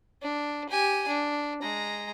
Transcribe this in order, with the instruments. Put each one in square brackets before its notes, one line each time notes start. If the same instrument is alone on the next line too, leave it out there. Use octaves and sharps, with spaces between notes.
[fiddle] D4
G4 G#5
D4
G#3 A#5